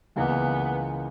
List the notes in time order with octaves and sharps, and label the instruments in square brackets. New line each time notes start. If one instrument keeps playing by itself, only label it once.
[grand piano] C#2 C#3 E3 A#3 [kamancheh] B3